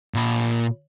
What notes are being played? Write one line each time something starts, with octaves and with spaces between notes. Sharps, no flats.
A#2 B5